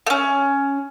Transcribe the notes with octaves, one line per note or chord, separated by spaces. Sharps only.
A3 C#4